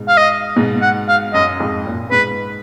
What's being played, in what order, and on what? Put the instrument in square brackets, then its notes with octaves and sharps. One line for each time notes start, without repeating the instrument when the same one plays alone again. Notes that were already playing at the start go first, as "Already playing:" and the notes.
Already playing: [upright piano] G#2 B2
[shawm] F5
D#5
[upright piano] G#2 B2
[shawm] F#5
F5
[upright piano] F#2 [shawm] D#5
[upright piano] F2 G#2
F#2 A#2
[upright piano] G#2 B2 [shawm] B4